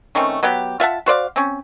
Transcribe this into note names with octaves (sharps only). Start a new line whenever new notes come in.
D#3 A3 C4 C#4
F#3 B3 G4
F4 E5 F#5 A5
F#4 C5 D5 F5
C4 C#4